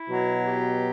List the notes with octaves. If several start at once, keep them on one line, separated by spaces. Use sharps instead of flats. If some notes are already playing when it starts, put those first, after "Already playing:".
Already playing: E4
B2 F#3
G4